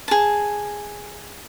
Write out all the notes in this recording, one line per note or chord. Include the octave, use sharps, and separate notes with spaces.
G#4 A5